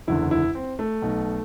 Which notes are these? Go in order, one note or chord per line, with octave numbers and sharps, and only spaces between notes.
F#1 E2 D3 E4
E4
C4
A3
B1 B2